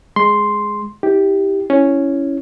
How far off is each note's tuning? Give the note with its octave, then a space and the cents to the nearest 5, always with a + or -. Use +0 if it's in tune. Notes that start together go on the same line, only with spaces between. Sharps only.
G#3 +0 C6 +0
E4 -35 G4 +0
C#4 +0 E4 +0